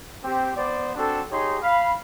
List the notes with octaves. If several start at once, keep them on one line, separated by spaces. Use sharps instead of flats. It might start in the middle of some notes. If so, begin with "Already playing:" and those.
C4 G4
B3 C5 D5
C4 D4 F#4 A4
D#4 G4 G#4 C#5 C6
F5 B5